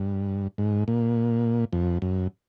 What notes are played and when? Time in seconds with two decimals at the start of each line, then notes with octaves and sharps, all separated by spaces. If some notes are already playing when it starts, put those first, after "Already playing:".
Already playing: G2
0.58 G#2
0.88 A#2
1.73 F2
2.02 F#2